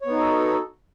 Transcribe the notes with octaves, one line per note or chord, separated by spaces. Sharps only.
B3 D#4 F#4 A4 C#5